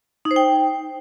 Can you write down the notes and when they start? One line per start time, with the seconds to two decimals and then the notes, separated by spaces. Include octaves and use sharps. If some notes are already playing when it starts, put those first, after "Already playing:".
0.25 D#4
0.31 C5
0.36 G5